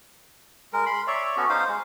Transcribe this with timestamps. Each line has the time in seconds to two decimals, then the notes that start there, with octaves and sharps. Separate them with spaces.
0.73 G#3 A#4
0.86 B5 C6
1.07 C#5 D5 E5
1.37 B3 C#4 F#4 A4
1.49 D#4 C5 F5
1.68 G#3